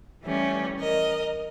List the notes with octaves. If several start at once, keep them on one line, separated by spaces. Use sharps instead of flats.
E3 G3 A3 C#4
A#4 D#5